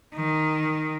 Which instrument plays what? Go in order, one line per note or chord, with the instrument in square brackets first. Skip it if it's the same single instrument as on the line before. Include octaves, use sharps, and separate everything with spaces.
[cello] D#3